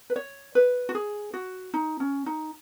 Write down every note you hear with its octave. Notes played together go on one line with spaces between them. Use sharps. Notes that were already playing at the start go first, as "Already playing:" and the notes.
B4
C#5
B4
F#4
G#4
F#4
D#4
C#4
D#4